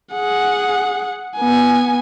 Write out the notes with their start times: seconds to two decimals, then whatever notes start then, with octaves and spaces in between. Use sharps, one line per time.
0.13 G#4 F#5
1.37 B3 G#5